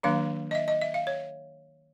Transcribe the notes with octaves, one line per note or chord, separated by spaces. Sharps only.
D#3 F#3 A#3 D4 F5
D#5
E5
D#5
E5
F5
C#5